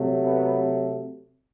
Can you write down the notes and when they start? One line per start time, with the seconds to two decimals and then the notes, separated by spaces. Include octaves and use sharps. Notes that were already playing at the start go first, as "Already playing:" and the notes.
Already playing: C3 F#3 A3
0.24 B3